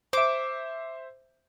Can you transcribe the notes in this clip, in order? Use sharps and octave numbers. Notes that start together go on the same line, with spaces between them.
C5 E5 D6